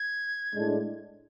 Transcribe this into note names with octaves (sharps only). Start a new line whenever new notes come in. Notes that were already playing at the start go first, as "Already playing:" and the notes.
Already playing: G#6
A2 G#3 D4